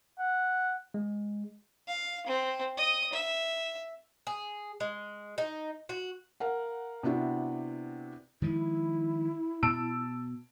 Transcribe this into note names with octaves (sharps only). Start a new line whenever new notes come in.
F#5
G#3
F5
C4
D#5 D#6
E5
G#4
G#3
D#4
F#4
A#4 F5 F#5
C3 B3 D4 E4 F#4 G4
D#3 F3 G#3 E4
B2 A5 E6 D7